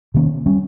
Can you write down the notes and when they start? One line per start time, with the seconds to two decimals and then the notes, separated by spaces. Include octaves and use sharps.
0.14 C3 D#3 A#3 C#4
0.46 G3 C#4